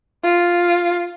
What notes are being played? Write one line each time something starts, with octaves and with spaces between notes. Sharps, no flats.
F4